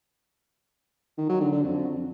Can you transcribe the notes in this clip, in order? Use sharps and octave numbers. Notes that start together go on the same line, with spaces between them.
D#3
F#3
D3
D3
F2